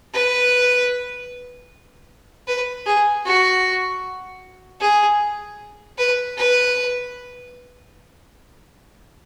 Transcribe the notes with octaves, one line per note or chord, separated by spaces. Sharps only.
B4
B4
G#4
F#4
G#4
B4
B4